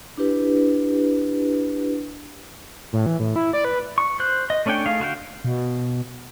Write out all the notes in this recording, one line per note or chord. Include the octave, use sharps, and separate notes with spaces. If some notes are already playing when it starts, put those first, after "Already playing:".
D4 E4 G4 B4
A2
E3
A2
E4
D5
B4
C#6
C5 F#6
D#5
A3 C#4 D4 C#5 G5
A3 D#4 G#4 F5
D3 F#4 F5 G5
B2